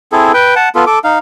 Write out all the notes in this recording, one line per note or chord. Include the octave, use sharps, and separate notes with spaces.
C4 E4 G#4 A4
B4 G5
F#5 A5
B3 F4 A4
A4 D6
D#4 F5